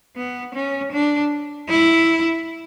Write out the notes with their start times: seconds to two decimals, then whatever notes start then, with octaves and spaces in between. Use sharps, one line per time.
0.16 B3
0.55 C#4
0.92 D4
1.69 E4